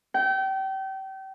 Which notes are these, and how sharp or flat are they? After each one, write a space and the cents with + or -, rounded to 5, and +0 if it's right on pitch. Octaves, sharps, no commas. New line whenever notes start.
G5 -30